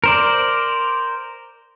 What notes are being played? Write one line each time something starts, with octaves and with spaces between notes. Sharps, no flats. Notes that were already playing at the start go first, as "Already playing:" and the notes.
A#4 C5 D5